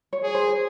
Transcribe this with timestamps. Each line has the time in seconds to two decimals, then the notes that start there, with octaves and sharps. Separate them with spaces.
0.13 C#5
0.23 G#4
0.35 C5